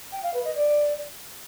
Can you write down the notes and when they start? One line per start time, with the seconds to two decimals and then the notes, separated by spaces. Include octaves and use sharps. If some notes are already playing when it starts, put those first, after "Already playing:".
0.12 G5
0.23 F5
0.34 B4
0.45 D#5
0.55 D5